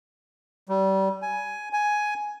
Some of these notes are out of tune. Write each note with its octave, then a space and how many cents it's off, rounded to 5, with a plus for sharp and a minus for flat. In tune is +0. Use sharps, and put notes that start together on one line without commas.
G3 -25
G#5 +10
G#5 +10